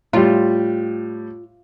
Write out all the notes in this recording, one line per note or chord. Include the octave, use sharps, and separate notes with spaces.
A2 G3 F4